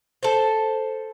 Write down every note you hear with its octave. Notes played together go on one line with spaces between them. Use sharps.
A4 C5